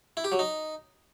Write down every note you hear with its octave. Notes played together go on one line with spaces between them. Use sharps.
E4
G4
F#3
D#4